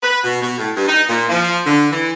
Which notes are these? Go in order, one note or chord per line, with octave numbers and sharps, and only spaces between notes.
B4
B2
B2
A2
G2
D#4
A#2
F3
D3
E3